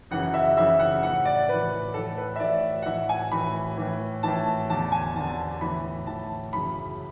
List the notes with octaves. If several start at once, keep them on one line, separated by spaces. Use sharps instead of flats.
F#2 C#3 E3 F#5
E5
F#2 C#3 E3 E5
F#5
A2 E3 F#5
D5
A2 E3 B4
A2 E3 A4
B4
E5
A2 E3 D5
F#5
A2 E3 E5
G#5
A2 E3 B5
A2 E3
A2 E3 A5
E2 D3 A5
G#5
E2 D3 A5
A2 E3 B5
A2 E3 A5
F#2 C#3 E3 B5